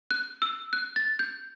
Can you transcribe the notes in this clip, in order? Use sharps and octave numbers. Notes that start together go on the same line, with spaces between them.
F#6
E6
F#6
A6
G6